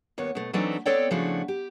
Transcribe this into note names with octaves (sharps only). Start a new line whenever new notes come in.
D#2 B3 C#5
B2 A3
E3 F#3 A3 C4 D4 D#4
B3 C4 A4 C#5 D5 G5
C#3 F3 A3 D4 E4 F#4
G4